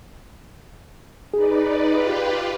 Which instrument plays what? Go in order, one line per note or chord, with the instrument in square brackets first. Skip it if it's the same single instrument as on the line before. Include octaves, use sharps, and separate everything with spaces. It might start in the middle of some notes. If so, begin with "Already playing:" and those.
[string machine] D#4 B4 D5 [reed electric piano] G#4
[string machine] F4 G4 B4